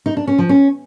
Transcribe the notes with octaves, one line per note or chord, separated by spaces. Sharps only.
D#4
D4
C#4
F3
C#4